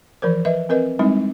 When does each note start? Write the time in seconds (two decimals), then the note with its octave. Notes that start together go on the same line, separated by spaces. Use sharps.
0.22 E3 F3 A#4 C5
0.45 B4 D#5 E5
0.69 C4 A#4 B4 D#5
0.99 G3 G#3 C4 D#4 E4